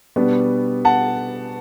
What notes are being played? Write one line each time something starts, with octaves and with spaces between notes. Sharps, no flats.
B2 G3 B3 D4
F#5 A5